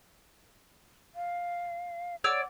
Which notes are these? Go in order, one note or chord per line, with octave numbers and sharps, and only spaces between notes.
F5
C#5 D5 F#5 E6